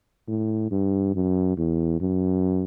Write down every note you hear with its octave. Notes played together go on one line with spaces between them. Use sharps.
A2
G2
F#2
E2
F#2